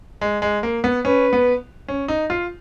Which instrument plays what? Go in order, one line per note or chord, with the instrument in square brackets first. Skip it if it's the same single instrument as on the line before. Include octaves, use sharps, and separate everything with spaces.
[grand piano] G#3
G#3
A#3
B3
[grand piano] C#4 [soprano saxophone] B4
[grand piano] B3
C#4
D#4
F4